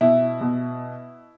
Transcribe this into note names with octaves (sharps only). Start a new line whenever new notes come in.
B2 E4
B2